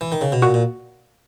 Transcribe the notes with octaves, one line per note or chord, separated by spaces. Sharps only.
E3
D#3
C#3
B2
A#2 F#4
A#2